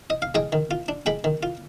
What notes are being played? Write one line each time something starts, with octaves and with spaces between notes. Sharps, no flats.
D#5
F5
G#3 D#5 G5
D#3
F4
D4
G#3 G5 B5
D#3
F4